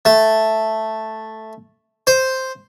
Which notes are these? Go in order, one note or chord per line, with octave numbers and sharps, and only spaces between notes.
A3
C5